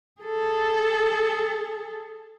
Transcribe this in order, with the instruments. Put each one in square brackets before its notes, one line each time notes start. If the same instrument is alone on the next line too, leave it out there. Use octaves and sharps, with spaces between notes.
[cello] G#4 A4